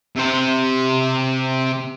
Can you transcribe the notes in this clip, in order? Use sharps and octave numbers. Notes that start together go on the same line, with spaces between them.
C3 C5